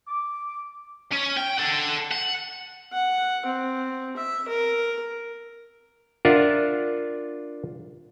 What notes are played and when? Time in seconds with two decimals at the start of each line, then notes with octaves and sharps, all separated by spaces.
0.08 D6
1.12 C#4
1.37 G5
1.58 A4 F#5
2.11 F#5
2.93 F#5
3.46 C4
4.17 E5
4.48 A#4
6.25 D4 F4 A#4 E5 F#5